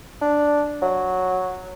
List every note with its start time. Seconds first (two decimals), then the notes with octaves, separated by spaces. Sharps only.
0.21 D4
0.82 F#3